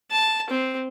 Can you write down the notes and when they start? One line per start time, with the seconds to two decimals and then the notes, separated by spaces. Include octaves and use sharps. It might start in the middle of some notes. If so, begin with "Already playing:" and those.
0.11 A5
0.50 C4